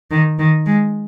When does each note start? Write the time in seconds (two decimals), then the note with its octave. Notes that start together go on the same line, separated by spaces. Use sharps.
0.11 D#3
0.39 D#3
0.66 G#3